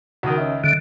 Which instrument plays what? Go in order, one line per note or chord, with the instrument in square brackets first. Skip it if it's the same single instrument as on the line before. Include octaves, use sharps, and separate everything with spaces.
[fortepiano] C#2 D#3 [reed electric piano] F#4 D#6
[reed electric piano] C#4 D#5 E5
[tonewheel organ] D3